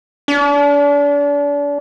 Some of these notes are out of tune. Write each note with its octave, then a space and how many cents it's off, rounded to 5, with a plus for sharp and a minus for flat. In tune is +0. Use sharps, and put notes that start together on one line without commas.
D4 -35